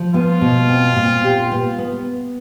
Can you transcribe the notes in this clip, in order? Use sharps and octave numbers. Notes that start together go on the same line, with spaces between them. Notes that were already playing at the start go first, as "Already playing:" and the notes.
Already playing: F3
B3 F4
B2
C4
A#2
G4
B3
B3